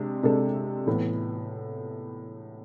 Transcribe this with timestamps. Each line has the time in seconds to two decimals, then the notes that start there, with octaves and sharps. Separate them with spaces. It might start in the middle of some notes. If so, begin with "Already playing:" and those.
Already playing: C3 G#3 D4
0.23 C3 G#3 D4 A4
0.87 A2 E3 B3